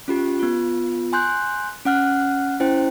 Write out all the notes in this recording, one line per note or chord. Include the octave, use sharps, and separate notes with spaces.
C#4 F4 G4
B3 F4
G#5 C6 F#6 G6
C#4 F#5 F6 F#6
C#4 E4 C5 G5